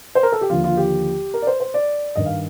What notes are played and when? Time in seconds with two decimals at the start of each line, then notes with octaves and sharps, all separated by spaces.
0.15 C5
0.23 A#4
0.32 A4
0.41 G4
0.50 D#2 D3 F3 F4
0.64 F4
0.77 G4
1.34 A#4
1.42 D5
1.47 C5
1.60 C5
1.74 D5
2.15 G2 D#3 D#5
2.26 F5